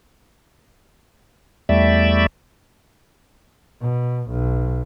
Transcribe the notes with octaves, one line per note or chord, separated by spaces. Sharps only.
E2 G3 A3 D5 E5
B2
B1